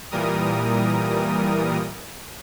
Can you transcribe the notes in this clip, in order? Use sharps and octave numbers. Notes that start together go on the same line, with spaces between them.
A#2 E3 G3 A#4 D#6